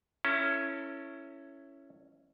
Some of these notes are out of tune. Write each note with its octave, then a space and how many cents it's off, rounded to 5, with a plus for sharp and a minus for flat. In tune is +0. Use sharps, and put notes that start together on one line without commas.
C#4 +0 E4 +10 A4 +35